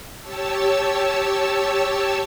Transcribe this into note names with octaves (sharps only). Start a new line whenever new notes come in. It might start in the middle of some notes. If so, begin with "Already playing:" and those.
G4 C#5 A5 E6